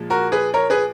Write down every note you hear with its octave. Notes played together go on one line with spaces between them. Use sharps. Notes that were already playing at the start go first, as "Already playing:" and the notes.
Already playing: A#2 F3 G#3
F#4 A#4
G#4 B4
A#4 C#5
G#4 B4